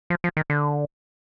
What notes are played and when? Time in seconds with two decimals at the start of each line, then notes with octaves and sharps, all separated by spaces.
0.10 F3
0.24 F3
0.37 D#3
0.50 D3